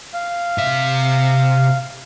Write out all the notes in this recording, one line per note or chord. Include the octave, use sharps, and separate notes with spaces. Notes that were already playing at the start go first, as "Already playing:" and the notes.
F5
C3 E5